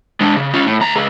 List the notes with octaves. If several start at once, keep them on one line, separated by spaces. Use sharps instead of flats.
G#3 D4
C#3
C#4 F4
A2
D2 A#5
C#2 G#4